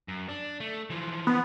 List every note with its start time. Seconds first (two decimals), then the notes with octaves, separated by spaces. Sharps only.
0.08 F#2
0.29 D4
0.60 A3
0.90 E3 F3
1.27 B3